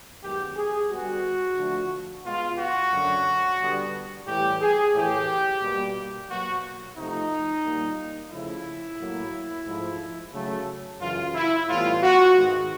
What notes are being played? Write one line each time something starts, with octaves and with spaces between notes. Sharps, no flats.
F#2 D#3 G#3 B3 G4
G#4
D3 G3 B3 F#4
D3 F3 A3
B2 G#3 B3 F4
F#4
F#2 D3 F#3
D3 G3 B3
A2 E3 G3 G4
G#4
A2 E3 A3 G4
B2 G3 A#3
B2 F#3 A#3 F#4
C3 F3 A3 D#4
A#2 G3 A#3
C#3 F3 A3 E4
A2 F#3 A#3
G#2 F3 A3
C#3 F#3 A3
F#2 C#3 E3 F4
E4
A2 E3 G3 B3 F4
F#4
G#2 D#3 G#3 B3 F#4